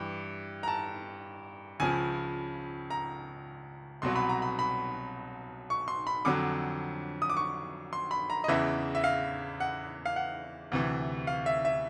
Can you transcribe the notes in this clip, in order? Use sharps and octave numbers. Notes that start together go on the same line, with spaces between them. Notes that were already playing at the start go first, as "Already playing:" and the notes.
Already playing: G2 E3
A#5
A5
C#2 C#3 F3 G#5
A#5
C2 B2 F#3 C6
B5
A#5
B5
B5
C#6
C6
B5
F2 D3 F#3 D6
D#6
D6
C#6
C6
B5
A#5
D#5
E2 C#3 E3 E5
E5
F5
F#5
F5
F#5
D2 C3 E3
F5
E5
E5